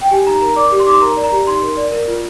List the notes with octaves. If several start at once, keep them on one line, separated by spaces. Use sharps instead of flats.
G5
G4 G#5
D#4 A#5
A#4 A#5
D5 D6
G4
C6
D#4 D6
C6
A#4 A#5
D5
A#5
G4
D#4 C6
A#4
D5
A#4
F4